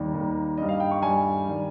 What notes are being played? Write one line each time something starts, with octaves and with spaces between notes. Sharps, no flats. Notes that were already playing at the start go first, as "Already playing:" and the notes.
Already playing: D#2 D#3 G3
D#2 D#3 G3
G2 G3 D#5
F5
G5
C#6
G2 G3 G#5
D#3 G3